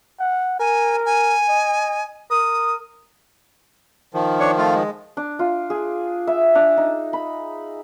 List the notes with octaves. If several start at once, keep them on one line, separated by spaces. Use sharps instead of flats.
F#5
A#4 G#5
G#5
D#5
A#4 D#6
D#3 F3
D4 C#5
A3 F4
G#3
D4
F4
G#4
E5
D4
D#4
B5